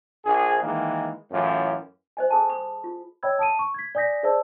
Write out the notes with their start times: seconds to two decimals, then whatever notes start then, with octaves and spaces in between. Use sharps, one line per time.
0.25 A#1 G#4
0.62 D#3 E3 G#3 A#3
1.31 F#2 A2 E3 F4
2.17 C5 D#5 G#5
2.30 G#4 A4 G#5 A5
2.49 B5 D#6
2.84 F4
3.23 C#5 D#5 G5 B5 E6 G#6
3.39 A5 D#6 D7 D#7
3.59 C#6
3.74 G#6 B6
3.95 D5 G#5 D#6 G6 A#6 B6
4.23 G#4 C5 D5 D#5 A5 E6